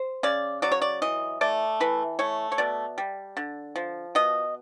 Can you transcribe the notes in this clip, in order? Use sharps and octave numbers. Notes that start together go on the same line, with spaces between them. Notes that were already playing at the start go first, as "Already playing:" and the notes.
Already playing: C5
C#3 D5
F#3 D5
C#5
D5
E3 D#5
A3 D5
E3 B4
A3 C#5
C#5
B2 D5
G3
D3
F3
B2 D#5